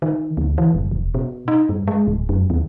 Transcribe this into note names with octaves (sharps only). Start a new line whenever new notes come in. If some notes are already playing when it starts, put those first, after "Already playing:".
D#3
D2
E3
F#1
E1
B2
D#4
G2
G#3
D1
F#2
D#2